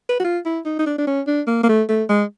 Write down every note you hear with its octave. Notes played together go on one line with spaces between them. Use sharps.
B4
F#4
F4
E4
D#4
D#4
D4
D4
C#4
D4
A#3
A#3
A3
A3
G#3